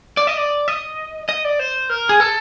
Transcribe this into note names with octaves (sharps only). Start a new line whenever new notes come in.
D5
D#5
D5
D#5
D#5
D5
C5
A#4
G#4
A4